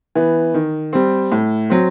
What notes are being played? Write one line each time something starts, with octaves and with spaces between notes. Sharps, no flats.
E3 B3
D#3
G3 C4
A2
F#3 C4